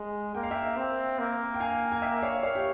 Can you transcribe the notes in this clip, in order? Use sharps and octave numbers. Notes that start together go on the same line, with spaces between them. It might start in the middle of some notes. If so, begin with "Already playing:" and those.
Already playing: G#3
A#3 G5
F5
E5 G5
C4
A#3
G5
F5 G#5
G#5
E5 G5
C#5 F5
C#5 F5
G4